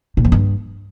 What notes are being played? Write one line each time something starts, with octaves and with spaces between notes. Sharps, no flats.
A#2
F2
G2